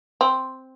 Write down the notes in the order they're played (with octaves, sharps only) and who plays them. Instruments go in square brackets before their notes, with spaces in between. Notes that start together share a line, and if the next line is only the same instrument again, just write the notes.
[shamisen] C4